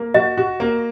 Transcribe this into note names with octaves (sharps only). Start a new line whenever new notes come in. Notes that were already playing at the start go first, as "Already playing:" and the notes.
Already playing: A#3
F#4 D#5
F#4
A#3